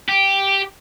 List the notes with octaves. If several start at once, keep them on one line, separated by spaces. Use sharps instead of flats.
G4